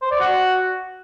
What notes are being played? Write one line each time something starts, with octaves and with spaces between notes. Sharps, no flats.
C5
D5
F#4